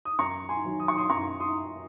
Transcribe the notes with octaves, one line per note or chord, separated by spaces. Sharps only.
D#6
F#2 A#5 C#6
G#5 C6
D#3 F#3
D#6
C#6
C6 D#6
F#2 A#5 C#6
C6 D#6